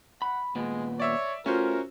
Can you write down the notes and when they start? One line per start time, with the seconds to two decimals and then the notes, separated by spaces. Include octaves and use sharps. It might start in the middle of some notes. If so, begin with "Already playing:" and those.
0.22 F#5 B5
0.56 D#2 A#2 G#3 B3
1.00 C#5 D5 E5 E6
1.46 A3 C#4 F4 F#4 A#4 C5